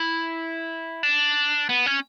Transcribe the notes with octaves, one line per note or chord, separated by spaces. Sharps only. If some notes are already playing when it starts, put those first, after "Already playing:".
Already playing: E4
D4
B3
C#4